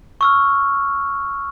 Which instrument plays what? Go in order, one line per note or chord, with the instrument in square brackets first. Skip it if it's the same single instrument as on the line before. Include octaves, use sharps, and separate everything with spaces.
[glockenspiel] C#6 E6 F6